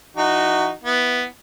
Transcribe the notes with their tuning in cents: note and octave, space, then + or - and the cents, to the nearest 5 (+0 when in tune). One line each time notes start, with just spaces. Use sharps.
E3 +0 D#4 -20 F#4 +5
B3 +0 E4 +0